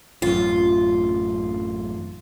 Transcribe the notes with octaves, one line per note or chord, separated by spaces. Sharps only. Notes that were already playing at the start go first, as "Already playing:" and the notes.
A1 F#2 F4